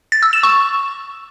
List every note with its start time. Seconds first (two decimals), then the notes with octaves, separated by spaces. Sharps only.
0.12 A6
0.23 E6
0.33 E7
0.43 C#6